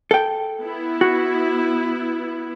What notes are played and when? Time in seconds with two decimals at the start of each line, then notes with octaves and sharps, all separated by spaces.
0.11 A4 G5
0.63 B3 E4
1.01 F#4